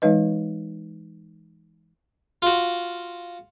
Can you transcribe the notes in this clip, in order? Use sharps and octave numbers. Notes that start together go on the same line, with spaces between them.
E3 G#3 D#4 B4 D#5
F4 F#4